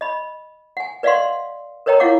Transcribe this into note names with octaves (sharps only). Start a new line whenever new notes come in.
D#5 B5
F#5 G#5
B4 D5 D#5 F5 F#5 C6
A#4 B4 C#5 D#5 G5 A#5
E4 F4 C#5 F5 F#5 D6